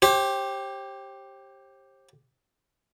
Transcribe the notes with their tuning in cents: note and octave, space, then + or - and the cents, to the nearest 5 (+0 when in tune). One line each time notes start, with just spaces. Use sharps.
G4 +0 C5 +40